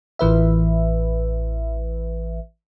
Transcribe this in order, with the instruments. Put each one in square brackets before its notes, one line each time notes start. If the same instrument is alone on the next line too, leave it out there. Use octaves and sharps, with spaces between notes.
[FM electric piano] A1 E3 B4 E5